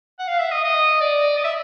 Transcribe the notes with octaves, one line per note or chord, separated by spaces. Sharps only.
F#5
F5
E5
D#5
D#5
D5
D#5
E5